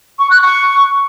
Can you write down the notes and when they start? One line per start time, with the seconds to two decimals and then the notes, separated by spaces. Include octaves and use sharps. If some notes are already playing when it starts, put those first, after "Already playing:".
0.19 C#6
0.31 F#6
0.42 C#6